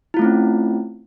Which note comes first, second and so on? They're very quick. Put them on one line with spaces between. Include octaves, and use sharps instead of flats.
E4 F4 A3 C4 C#4